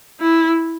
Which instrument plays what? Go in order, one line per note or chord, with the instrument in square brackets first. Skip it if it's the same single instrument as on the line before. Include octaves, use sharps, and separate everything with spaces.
[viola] E4